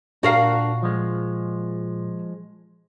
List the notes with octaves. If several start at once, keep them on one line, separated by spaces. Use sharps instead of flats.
A#2 D4 F#4 A#4 F5
F3 G#3